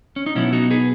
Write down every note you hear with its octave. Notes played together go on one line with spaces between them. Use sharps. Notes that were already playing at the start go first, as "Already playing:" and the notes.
C#4
D#4
B2 F#3 B3 C#4 E4
D#4 F#4
G#4 B4